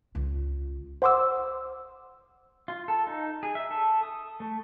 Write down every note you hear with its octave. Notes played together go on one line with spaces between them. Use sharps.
C#2 F4
C5 F#5 C6 D6 E6
F4
A4
D#4
G#4
E5
A4
D#6
A3